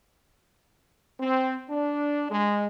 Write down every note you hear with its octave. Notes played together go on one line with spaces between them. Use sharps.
C4
D4
G#3